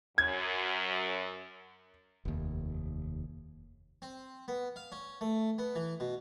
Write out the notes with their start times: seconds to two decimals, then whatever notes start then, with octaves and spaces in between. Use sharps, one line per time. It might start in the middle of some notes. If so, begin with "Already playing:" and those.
0.18 F#2 G#6
2.25 F1 D#2
4.02 C4
4.48 B3
4.76 F5
4.92 C#4
5.21 A3
5.58 B3
5.75 E3
6.00 B2